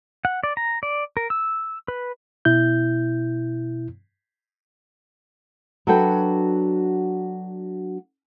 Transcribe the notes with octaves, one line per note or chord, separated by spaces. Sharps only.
F#5
D5
A#5
D5
A#4
E6
B4
B2 E4 G6
F#3 D4 F#4 A4 B4 G5